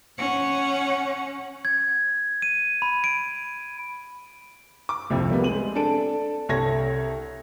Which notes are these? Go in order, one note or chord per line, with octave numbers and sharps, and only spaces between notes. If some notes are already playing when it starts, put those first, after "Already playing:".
C#4 F#5
G#6
D#7
B5
D7
D6
C2 F2 F3
G3 A#3 B3
G#3 C4 D#7 F#7
D4 A4 A5 D7
C2 A4 C#5 G#6 A#6